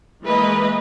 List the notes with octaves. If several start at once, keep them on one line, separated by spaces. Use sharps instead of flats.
E3 G#3 A#3 B4 D#5